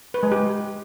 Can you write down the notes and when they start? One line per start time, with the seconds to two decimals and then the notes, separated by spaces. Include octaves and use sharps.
0.14 B4
0.23 G#3
0.32 G4